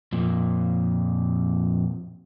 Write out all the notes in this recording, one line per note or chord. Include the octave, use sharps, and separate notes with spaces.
F2 A#2